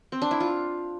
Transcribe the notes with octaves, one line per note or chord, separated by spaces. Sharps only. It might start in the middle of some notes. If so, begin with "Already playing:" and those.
C4
D4
E4
F4